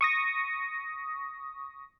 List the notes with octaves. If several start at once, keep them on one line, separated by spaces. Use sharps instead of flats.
C#6 D#6 A#6